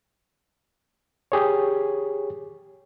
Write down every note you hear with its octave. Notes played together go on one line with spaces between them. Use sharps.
G4 G#4 C#5